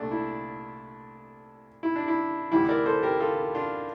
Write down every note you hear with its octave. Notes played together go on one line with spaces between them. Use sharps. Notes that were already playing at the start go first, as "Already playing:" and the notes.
Already playing: C2 A#2 A3 D4
E4
E4
D4
E4
D2 C3 E3 G3 E4
A#4 D5
A4 C5
G4 A#4
F4 A4
D4 F4